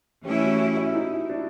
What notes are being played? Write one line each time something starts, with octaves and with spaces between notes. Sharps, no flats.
E3 A3 C#4 E4 G4
F#4
F#4
E4
D#4
D4